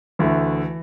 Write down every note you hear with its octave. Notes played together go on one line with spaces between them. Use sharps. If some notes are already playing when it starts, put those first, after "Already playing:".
D2 D3 E3 A3